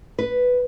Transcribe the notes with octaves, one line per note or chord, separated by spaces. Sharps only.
B4